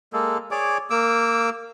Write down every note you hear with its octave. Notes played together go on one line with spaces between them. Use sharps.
G#3 A#3 A4
G#4 C#5 D5 D6
A#3 D6 E6